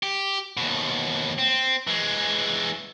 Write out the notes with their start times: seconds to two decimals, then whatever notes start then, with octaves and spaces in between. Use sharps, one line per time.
0.03 G4
0.57 D#2 B2
1.39 C4
1.87 E3 G#3